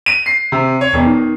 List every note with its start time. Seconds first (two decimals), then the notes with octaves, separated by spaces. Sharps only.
0.06 D#7
0.26 C7
0.52 C3
0.81 C#5
0.93 E1
1.05 D#3